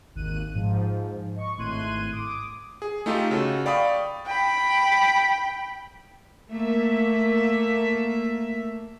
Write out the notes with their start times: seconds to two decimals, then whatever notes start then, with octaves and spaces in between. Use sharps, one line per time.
0.15 G#1 D#2 F#6 D#7
0.55 G#2 F3
1.36 D#5 C#6
1.57 G#1 A2 C6 F#6 G#6 D#7
2.12 D6 D#6
2.82 G#4
3.06 A3 D#4 F4 G4 A4
3.31 C#3 F#4 A4
3.66 D5 F5 G5 B5 C#6 D#6
4.26 G5 B5
6.50 A3 A#3 E5